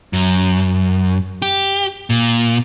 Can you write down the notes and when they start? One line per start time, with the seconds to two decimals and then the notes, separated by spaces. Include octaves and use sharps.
0.13 F#2
1.42 G4
2.10 A#2